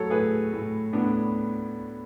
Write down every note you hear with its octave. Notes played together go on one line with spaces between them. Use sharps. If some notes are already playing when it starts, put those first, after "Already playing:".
Already playing: A2 F#3 A4 C#5
A2 G#4 B4
A2
A2 B3 D4